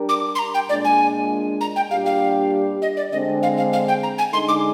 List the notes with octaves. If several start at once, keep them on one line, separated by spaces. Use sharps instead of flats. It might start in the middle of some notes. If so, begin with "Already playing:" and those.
Already playing: G3 D4 G4 A#4
D6
C6
A#5
G5
A#2 G#3 D4 D5
G#5
A#5
G5
A#2 G3 D4 G4 F5
F5
D#5
D5
D3 G#3 C4 D#5
F5
F5
F5
G5
A#5
G#5
D3 G#3 D#4 C6
D6